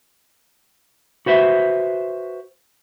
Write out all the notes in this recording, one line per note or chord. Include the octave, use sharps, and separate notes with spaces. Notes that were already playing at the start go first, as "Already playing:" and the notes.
F#4 B4 C5 E5